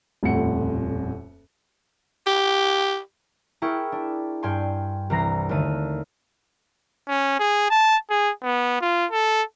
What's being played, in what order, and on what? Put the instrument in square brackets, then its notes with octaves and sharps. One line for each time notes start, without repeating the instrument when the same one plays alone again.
[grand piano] D#1 F2 A2 F#5 C#7
[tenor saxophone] G4
[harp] E4 G#4 A#4 G5 C#6
D4
G2 G5 G#5 C6
C2 E3 A#5 A#6 C7
D#2 D3 A3 D#7
[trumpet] C#4
G#4
A5
G#4
B3
F4
A4